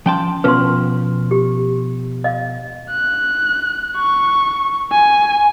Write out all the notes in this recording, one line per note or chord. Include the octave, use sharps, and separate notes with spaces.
F3 C#4 G5 A5 C6
B2 F3 C#4 B4 C6
G4
D#5 F5
F#6
C#6
G#5